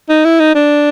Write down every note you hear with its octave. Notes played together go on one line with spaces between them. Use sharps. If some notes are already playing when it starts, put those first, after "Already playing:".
D#4
E4
D#4
D4